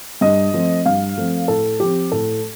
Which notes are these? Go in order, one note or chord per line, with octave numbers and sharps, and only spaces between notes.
G2 D#5
F3 A3 C4
G2 F5
F3 A3 C4
A2 A4
F3 G4
C4
A2 A4